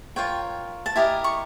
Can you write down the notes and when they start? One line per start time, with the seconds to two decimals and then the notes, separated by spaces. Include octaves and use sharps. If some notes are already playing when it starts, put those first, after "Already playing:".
0.16 F4 A#4 C#5 G5
0.86 A5
0.95 E4 G4 A#4 D#5 G#5
1.24 C#6